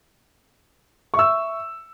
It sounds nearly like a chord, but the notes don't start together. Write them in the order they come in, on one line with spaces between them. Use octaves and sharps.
C#6 E5 E6